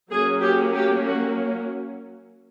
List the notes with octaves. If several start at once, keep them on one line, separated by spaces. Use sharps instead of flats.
F#3 A#3 C#4 G#4
G4
G4
F#4